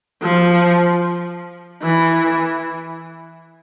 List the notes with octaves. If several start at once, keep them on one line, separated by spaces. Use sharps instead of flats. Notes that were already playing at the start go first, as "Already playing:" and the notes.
F3
E3